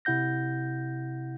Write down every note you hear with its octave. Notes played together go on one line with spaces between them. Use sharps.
C3 E4 F#5 G6 A#6